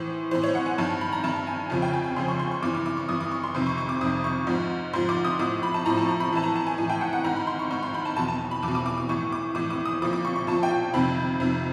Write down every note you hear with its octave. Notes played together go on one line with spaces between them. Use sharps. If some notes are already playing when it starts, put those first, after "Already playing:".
Already playing: A2 E3 C5
A2 E3 C5
C#5
F#5
G#5
G2 D#3 A5
B5
A#5
G2 D#3 A5
G#5
F2 C#3 F3 G#5
G5
G#5
G#5
F2 C#3 F3 C6
C#6
C6
C#6
G2 E3 D6
D6
D6
C#6
G2 E3 D#6
D6
C#6
C6
F2 C3 D#3 C6
C#6
C#6
D6
F2 C3 D#3 D#6
C#6
G#2 F3
G#2 F3 C6
D6
D#6
A2 F3 D6
B5
A5
A2 F3 A#5
A5
A#5
B5
A2 E3 A5
A#5
A5
G#5
A2 E3 G#5
G5
F#5
F#5
G#2 D#3 A#5
B5
C6
C#6
G#2 D#3 C#6
C6
B5
A5
E2 B2 A5
A5
B5
E2 D6
B2
D6
D6
D6
A2 E3 C#6
D6
A2 E3 D6
D6
D#6
A#2 F3 D6
D6
C#6
C#6
A#2 F3 A5
G5
F2 C3 D#3 B5
F2 C3 D#3